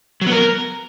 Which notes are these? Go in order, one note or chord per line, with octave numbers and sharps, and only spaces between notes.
F#3
B3
A#4